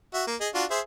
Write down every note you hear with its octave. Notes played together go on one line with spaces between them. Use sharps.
F#4 E5
A#3
G#4 D#5
D4 F4 F#4
G#4 C5 E5